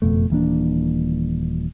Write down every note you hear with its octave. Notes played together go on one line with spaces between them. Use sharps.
F#1 F2 B2 A3
D#1 E3 A#3 D4